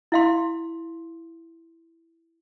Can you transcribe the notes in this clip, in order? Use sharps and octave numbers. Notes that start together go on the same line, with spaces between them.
E4 F5 C6